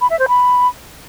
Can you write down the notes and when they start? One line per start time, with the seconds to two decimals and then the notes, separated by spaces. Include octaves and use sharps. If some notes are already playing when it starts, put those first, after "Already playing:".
0.01 B5
0.10 E5
0.19 C5
0.28 B5